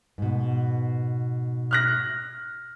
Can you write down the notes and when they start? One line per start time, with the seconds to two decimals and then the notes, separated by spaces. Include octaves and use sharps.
0.18 G#2 B2
1.71 F6 F#6 A#6